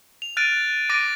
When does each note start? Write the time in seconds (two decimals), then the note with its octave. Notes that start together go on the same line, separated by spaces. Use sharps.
0.22 F7
0.37 F6 F#6 A6 D7 D#7
0.90 D6 A6 A#6 D7 D#7